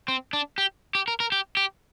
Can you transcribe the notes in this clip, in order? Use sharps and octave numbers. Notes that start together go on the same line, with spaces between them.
C4
D4
G4
G4
A#4
A#4
G4
G4